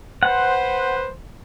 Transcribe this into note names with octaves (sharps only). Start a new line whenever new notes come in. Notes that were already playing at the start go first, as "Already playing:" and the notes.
B4 C5 F#5